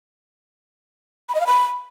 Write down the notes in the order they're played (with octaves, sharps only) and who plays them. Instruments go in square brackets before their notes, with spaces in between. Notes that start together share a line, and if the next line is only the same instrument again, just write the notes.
[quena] B5
D#5
F5
B5